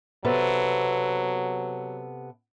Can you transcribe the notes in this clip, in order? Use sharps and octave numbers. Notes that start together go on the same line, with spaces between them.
C3 F#3 B3 A4